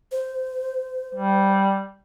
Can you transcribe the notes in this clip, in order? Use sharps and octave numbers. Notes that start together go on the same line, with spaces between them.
C5
G3